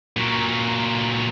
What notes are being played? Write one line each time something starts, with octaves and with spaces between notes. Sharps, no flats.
A#2 F#3